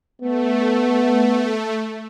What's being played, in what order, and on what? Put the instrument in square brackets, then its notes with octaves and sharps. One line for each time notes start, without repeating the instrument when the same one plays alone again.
[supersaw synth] A3 [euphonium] B3